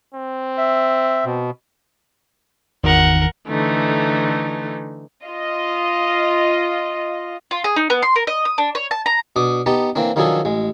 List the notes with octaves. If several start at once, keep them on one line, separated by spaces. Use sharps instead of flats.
C4
E5
B2
G#1 E2 D#3 A#4 F#5
D3 E3 A3 D#4
F4 D#5
F4
G#4
D#4
B3
C6
A#4
D#5
D#6
D4
C#5
A5
A#5
B2 D4 D6 D#6
B3 D#4 G4 A5
E3 A#3 C4 D4
D#3 F3 F#3 D4 G#4 A4
A1 G#3